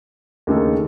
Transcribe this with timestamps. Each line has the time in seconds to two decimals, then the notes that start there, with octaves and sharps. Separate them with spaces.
0.47 D#2 C#3 A3 D#4 A4